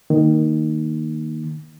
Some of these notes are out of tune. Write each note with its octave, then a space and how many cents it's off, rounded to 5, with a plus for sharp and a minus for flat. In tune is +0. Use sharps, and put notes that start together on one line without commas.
D#3 +0 A#3 +0